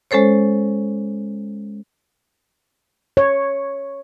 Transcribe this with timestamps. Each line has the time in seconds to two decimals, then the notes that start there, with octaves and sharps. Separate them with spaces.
0.11 G#3 C#4 A4 C5 C#5
3.17 C#5